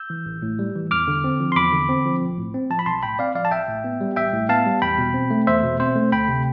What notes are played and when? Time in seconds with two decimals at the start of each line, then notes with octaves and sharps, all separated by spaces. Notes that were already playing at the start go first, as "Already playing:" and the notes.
Already playing: E6 G6
0.10 E3
0.26 A1
0.42 A2
0.59 G3
0.75 E3
0.91 E2 D6 F6
1.08 D3
1.24 C4
1.40 F3
1.52 C6
1.56 E2 B5 D6
1.73 D3
1.89 C4
2.05 F3
2.22 B1
2.38 A2
2.54 C4
2.70 F3 A5
2.79 B5
2.86 B1 A5 C6
3.03 A2 G5 B5
3.19 C4 D5 F5
3.35 F3 D5 F5
3.45 A5
3.51 A1 E5 G5
3.68 A2
3.84 B3
4.01 G3
4.16 A1 E5 G5
4.33 A2
4.49 B3 F5 A5
4.66 G3
4.82 E2 G5 B5
4.98 B2
5.14 C4
5.30 A3
5.47 E2 C5 E5
5.63 B2
5.80 C4 C5
5.96 A3
6.12 D2 G5 B5
6.28 C3